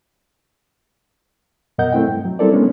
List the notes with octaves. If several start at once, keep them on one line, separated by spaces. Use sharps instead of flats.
F#2 B2 A#4 D#5 F#5 G6
A3 C4 E4 G5
G2
F#3
G3 C4 E4 A4 A#4 D5
G#3 A3 B3 C#4 D4